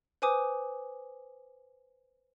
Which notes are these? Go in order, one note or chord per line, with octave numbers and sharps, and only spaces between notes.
B4 C5 G#5 D6 D#6